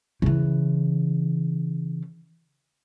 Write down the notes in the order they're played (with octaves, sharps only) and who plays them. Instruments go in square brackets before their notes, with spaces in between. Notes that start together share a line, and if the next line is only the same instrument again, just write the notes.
[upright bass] C#3 E3